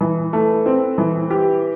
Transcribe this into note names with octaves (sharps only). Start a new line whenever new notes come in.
E3
A3
C4
E3
G4